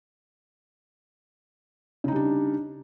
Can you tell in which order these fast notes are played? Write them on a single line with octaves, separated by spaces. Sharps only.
C#3 D#4 G3 D4